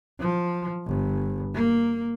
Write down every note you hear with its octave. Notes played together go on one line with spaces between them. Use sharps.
F3
G1
A#3